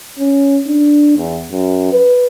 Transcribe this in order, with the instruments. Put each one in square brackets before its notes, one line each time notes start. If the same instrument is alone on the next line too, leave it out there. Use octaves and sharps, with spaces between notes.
[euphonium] C#4
D4
E2
F#2
B4